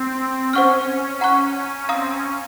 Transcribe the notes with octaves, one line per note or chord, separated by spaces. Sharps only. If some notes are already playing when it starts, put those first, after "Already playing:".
Already playing: C4
C#4 C5 F#5 C#6 F6
F#5 A#5 C#6 F#6
C4 F5 A#5 D#6
C#4